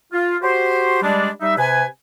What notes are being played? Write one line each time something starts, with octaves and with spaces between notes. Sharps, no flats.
F4
F#4 G4 C5
G3 G#3 D4
G3 D#4 E5
C3 B4 G#5